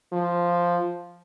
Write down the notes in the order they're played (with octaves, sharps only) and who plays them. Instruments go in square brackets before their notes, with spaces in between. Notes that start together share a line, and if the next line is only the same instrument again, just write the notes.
[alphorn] F3